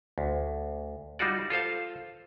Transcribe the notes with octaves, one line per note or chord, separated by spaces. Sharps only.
D2
G3 D#4 F4 F#4 D5
F4 A4 C5 F5